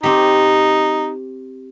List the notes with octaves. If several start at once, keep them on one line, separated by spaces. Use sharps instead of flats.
C4 D#4 G4